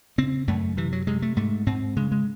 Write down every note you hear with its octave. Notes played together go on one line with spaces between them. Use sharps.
C#3 C4
F#2 A3
C3 E3
F#3
C3 G#3
A3
G#2 A3
G#2 C4
C#3 G#3
G#3